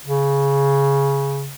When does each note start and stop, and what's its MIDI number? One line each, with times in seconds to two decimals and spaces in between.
0.05 1.53 49